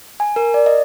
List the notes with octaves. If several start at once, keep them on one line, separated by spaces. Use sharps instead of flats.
G#5
A#4
D5
D#5